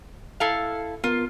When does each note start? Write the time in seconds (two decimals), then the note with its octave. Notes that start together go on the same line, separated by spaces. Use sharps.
0.40 E4 A4 F5
1.04 B3 F4 A#4